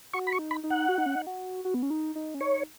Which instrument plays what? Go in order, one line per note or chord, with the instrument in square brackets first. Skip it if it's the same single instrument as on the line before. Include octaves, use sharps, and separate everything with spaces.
[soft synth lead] F#4 [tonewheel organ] C#6
[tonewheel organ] B5
C#6
[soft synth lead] D#4
[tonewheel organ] B5
[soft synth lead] D#4
[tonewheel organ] F#5
[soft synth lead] F#4
D#4
C#4
D#4
F#4
F#4
B3
C#4
D#4
D#4
C#4
[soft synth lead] D#4 [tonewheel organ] C#5